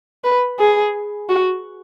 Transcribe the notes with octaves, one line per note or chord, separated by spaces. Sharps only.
B4
G#4
F#4